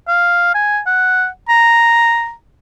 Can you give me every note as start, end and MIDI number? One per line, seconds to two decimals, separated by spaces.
0.08 0.55 77
0.55 0.81 80
0.86 1.26 78
1.49 2.32 82